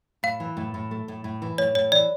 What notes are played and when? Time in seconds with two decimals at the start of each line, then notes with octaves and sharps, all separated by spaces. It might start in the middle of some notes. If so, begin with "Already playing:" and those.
0.23 A2 F5
0.40 E3
0.57 A2
0.74 A2
0.91 A3
1.08 A2
1.24 A2
1.42 E3
1.58 A2 C#5
1.75 A2 C#5
1.92 E3 D5